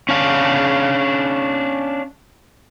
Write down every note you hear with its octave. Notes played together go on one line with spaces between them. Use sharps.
C#4 D4 F5